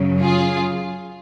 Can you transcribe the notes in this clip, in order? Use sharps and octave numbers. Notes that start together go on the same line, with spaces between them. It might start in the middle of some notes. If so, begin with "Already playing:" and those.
Already playing: F#2 C#3 F#3
F4 G#4